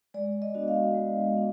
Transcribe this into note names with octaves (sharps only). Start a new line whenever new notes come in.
G#3 D5
D#5
B3 D4 F#4
F5
G#3
B3 D4